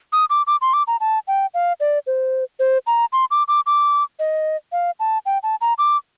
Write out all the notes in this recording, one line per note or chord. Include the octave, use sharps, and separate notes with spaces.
D#6
D6
D6
C6
D6
A#5
A5
G5
F5
D5
C5
C5
A#5
C6
D6
D6
D6
D#5
F5
A5
G5
A5
A#5
D6